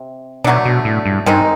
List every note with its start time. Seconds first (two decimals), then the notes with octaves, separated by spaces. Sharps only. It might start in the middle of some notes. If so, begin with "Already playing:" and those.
Already playing: C3
0.44 B2 D3 F#3 A3 D4
0.65 B2
0.85 A2
1.06 G2
1.26 G2 D#3 G#3 C4 D#4